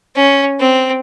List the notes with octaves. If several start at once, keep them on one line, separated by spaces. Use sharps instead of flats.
C#4
C4